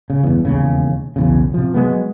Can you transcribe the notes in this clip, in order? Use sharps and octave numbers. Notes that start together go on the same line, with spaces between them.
C#3
G1 E2
E1 D#2 C#3
B1 E2 C#3
C3 F3
F#3 G#3 B3